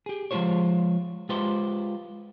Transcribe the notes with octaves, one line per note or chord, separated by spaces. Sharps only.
G4 G#4
F3 G#3 A3 F4 C5 C#5
G#3 F4 G4 B4 C5